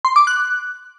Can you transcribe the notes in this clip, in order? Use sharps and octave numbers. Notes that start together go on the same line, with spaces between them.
C6
D6
F#6